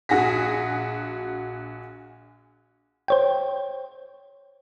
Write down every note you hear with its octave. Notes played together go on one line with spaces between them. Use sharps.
A#1 F#4 G#4 A#6 B6
C5 C#5 G5